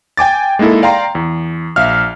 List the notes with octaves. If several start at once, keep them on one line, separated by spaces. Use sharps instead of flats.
G5 G#5 D6 A6
G#3 A#3 D#4 E4 A4
D5 F5 G5 A#5 C6
E2
A#1 E5 F5 F6